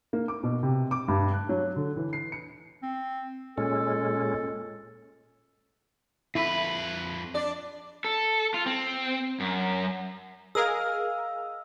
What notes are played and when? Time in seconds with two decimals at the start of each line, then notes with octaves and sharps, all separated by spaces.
0.13 A#3
0.28 D6
0.43 B2
0.63 C3
0.91 D6
1.08 G2
1.34 F#6
1.49 F#3
1.76 D3
1.96 E3
2.13 C7
2.32 C#7
2.83 C4
3.58 A#2 G#3 C#4 A4
6.35 F2 E4 B4
7.34 D4 D5
8.05 A4
8.54 F4
8.66 C4
9.40 F#2
10.55 G#4 A#4 D#5 F5 E6